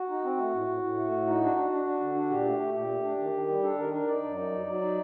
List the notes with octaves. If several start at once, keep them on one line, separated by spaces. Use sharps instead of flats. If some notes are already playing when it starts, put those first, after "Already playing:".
Already playing: F#4
D#4
C4
A3
A2
A2
A2
A3
A2
D#4
D4 F#4
D4
D4
D4
D3
D4
A#2 G4
A3
A3
A#2 G4
A3
D4
D#3
D#3
G3
D4 A4
D#3 A#4
D4 A#4
D#4 D5
F#2
D#4
F#3
F#3
D#4